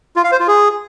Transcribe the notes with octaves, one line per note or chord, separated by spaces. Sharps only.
F4
F5
C5
F4
G#4